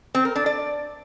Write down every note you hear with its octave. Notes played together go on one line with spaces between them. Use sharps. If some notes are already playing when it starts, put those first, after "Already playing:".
C4
A#4
D4
D5